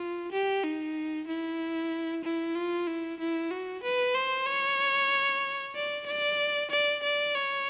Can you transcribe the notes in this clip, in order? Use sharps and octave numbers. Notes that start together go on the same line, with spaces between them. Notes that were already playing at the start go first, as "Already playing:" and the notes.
Already playing: F4
G4
D#4
E4
E4
F4
E4
E4
F#4
B4
C5
C#5
D5
D5
D5
D5
C#5